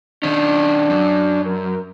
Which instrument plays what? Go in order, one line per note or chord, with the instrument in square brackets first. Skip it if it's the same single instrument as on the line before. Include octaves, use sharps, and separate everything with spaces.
[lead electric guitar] D#3 C#4 [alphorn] D4
[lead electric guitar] F#2
[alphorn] A#4